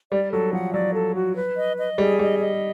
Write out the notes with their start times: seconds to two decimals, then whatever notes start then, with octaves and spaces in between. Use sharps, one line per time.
0.12 G3 D5
0.32 F#3 A4
0.53 F3 F#5
0.73 F#3 D5
0.95 A4
1.15 F#4
1.36 B4
1.57 D#5
1.77 D#5
1.98 G3 G#4
2.19 G3 D#5
2.40 D#5